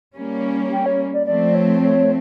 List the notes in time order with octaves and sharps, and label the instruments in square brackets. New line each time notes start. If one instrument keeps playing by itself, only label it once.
[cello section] G3 A#3 C#4
[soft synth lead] G5
C#5
D5
[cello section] F3 A3 C4 [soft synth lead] D5
[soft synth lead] C#5
C#5